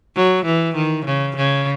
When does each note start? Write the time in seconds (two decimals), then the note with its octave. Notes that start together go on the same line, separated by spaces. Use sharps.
0.16 F#3
0.45 E3
0.75 D#3
1.05 C#3
1.37 C#3